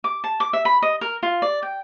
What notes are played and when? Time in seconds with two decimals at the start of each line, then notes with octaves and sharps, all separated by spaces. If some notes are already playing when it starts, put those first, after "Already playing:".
0.04 D6
0.24 A5
0.40 D6
0.53 E5
0.65 B5
0.82 D#5
1.01 A#4
1.23 F4
1.42 D5
1.63 G5